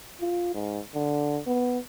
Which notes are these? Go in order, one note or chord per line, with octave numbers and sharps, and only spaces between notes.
F4
G#2
D3
B3